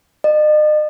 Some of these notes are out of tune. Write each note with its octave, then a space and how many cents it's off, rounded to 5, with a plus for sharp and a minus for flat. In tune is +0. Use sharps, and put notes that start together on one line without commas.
D#5 -40